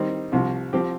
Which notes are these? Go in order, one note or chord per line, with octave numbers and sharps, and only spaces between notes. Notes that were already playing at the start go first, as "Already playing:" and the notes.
Already playing: D#3 G3 C4 D#4
C2 C3 F3
F3 C4 G4